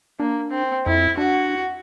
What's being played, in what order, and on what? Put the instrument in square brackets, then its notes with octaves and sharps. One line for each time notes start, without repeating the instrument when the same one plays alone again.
[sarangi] A#3 [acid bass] D4
[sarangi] C4
[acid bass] F2 [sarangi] E4
[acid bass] D4 [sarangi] F#4